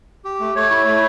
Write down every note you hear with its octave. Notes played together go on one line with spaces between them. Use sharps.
G4
A3
A3 C#5
E4
A3